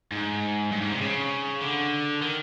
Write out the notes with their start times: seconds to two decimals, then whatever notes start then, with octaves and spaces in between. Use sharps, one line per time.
0.12 G#2
0.72 G2
0.82 G#2
0.92 C3
1.01 C#3
1.61 D3
2.22 D#3